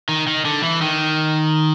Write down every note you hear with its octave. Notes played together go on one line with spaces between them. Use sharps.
D#3
D#3
D3
E3
D#3